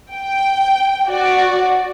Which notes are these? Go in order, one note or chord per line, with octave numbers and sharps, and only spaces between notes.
G5
F#4 D5